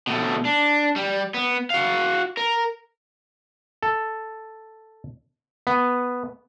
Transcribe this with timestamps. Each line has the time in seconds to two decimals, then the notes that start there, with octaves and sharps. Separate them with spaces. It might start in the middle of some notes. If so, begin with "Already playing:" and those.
0.07 B2 A3
0.45 D4
0.96 G3
1.34 B3
1.70 F#4 F5
2.37 A#4
3.83 A4
5.67 B3